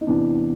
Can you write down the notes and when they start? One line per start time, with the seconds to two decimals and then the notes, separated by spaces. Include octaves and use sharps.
0.01 D#4
0.07 E2 C3 E3 D4